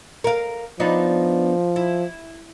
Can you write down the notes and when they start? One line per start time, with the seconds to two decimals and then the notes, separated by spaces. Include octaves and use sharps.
0.24 A#4 F5
0.80 F3 B3 D4 D#4
1.76 E4